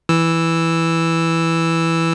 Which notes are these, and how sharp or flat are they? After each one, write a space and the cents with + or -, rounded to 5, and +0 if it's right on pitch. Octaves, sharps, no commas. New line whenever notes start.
E3 +0 E6 +0